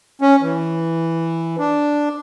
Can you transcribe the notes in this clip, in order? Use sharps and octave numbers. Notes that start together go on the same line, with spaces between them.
C#4
E3
D4